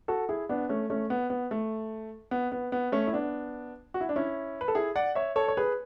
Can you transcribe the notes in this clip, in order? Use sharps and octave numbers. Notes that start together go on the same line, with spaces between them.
F#4 A4
E4 G#4
B3 D4
A3 C#4
A3 C#4
B3
B3
A3
B3
B3
B3
A3 C#4
E4
B3 D4
F#4
E4
D4
C#4 E4
B4
A4
E4 G#4
D5 F#5
C#5 E5
A4 C#5
C#5
G#4 B4